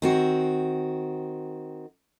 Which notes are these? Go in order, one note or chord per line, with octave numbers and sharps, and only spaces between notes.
D#3 C4 F#4